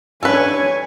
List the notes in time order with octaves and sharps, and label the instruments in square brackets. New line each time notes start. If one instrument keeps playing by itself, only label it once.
[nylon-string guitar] C#4 D4 G4 [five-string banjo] A4 B4 [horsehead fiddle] C#5 G#5